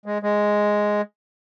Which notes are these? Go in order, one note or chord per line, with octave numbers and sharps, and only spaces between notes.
G#3
G#3